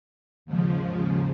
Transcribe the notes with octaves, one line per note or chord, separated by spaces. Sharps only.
D#2 G#2 C#3 F3